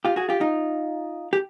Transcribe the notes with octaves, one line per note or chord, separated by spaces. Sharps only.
F4 G4
F#4 G#4
F4 G4
D#4 F4
G4